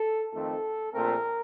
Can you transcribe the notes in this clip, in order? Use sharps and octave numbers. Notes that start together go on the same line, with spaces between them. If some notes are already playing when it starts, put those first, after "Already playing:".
Already playing: A4
F2 D#3 A3 C4 A4
A#1 A#2 A3 C4 A#4